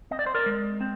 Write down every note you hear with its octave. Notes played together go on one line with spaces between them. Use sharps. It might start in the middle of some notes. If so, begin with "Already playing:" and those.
C4 D#5
D5
C5
A#4 D5
G#3
C4